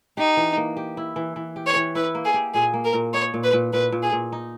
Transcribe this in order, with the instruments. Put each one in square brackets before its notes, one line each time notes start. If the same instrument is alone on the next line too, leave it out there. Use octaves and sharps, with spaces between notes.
[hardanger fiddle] D#4 [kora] G4
[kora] E3
A#3
G4
E4
E3
E3
G4
[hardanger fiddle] C#5
[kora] E3
[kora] E4 [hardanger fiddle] B4
[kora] A#3
[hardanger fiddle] G#4
[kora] G4
[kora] A#2 [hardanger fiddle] G#4
[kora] A#3
[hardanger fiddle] A#4
[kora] A#2
[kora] D#4 [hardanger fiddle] C#5
[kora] A#2
[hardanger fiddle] B4
[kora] A#2
[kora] A#2 [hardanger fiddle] B4
[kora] A#2
[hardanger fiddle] G#4
[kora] A#2
D#4